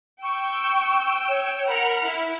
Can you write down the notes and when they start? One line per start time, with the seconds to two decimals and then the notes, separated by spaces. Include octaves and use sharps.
0.23 G5 C#6 E6
1.28 C#5
1.67 A#4 F#5 B5 F6
2.05 E4